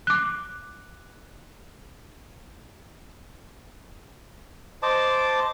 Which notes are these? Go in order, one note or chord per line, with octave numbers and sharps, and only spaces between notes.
D6 F#6
C5 D#5 A5 D6